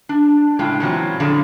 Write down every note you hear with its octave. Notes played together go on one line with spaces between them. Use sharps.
D4
A2 C#3 G#3 F4 G5
A#2 E3 F#3 C4
F2 D3 F3 G#4 F5